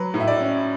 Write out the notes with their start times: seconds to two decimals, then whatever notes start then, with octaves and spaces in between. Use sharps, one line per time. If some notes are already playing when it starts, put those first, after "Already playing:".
Already playing: F#3 B4
0.14 A2
0.20 E5
0.28 D5
0.40 C#4